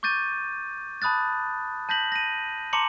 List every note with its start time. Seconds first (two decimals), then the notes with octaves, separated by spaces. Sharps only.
0.03 C#6 D6 G6 A6 D#7
1.02 A5 B5 D#6 F#6 A6
1.89 A5 G6 A#6 B6 F#7
2.12 A#6 D#7
2.73 A5 A#5 C6 D6 C#7 F#7